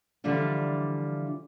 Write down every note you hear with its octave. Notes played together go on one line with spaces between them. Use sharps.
D3 E3 F3 G3 D4 F4